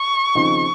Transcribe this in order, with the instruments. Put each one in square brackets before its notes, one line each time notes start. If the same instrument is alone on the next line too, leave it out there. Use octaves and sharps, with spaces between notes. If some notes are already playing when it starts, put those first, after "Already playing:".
Already playing: [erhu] C#6
[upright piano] D#2 C#3 F3 C4 D#4